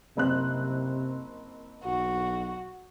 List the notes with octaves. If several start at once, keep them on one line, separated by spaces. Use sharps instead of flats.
F#1 C3 C4 F#6
B1 F#4